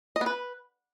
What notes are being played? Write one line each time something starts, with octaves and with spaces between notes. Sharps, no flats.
D#5
B3
B4